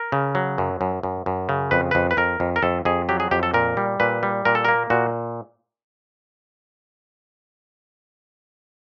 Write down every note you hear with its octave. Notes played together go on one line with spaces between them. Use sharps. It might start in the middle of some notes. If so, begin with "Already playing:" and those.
Already playing: A#4
C#3
F#3
F#2
F#2
F#2
F#2
C#3
F2 B4
F2 B4
B4
F2 A#4
F2
A#4
F2 A4
F2 G#4
F#3 G4
G#4
F2 G4
A4
A#2 A#4
G3
A#2 B4
G3
A#2 A#4
A4
A#3 A#4
A#2 F#4